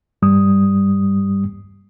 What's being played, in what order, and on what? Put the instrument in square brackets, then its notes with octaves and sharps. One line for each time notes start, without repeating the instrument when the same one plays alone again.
[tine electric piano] G2 G3 D#6